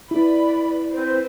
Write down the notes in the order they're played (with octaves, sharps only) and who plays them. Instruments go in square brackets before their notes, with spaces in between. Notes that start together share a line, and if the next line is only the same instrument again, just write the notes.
[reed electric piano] E4 [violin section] B4 D5 B5
[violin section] C4 B4 [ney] C5